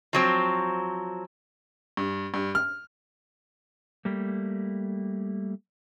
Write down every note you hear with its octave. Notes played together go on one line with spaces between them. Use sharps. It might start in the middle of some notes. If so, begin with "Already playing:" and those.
F3 F#3 C4
G2
G2
F6
G3 A3 A#3